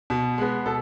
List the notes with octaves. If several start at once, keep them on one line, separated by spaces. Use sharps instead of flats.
B2
G#3 B3
B2 A4